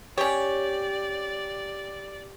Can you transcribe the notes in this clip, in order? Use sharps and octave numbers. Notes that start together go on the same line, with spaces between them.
C#4 G4 C#5 D5